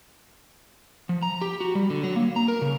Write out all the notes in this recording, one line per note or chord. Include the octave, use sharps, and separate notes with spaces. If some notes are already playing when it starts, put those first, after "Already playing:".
F3
A#5
G4
F#4
G3
D3
F#3
A#3
A#5
A#4
C#3